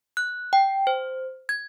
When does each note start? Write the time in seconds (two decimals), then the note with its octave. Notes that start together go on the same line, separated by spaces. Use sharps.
0.17 F#6
0.53 G5
0.87 C5
1.49 G#6